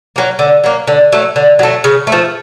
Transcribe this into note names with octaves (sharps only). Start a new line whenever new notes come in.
F#3 A#3
D3
F#3 A#3
D3
F#3 A3
D3
F#3 A3
C#3
A3
F3